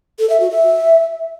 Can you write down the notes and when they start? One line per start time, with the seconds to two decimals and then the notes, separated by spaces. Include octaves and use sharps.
0.19 A4
0.30 E5
0.40 F#4
0.51 E5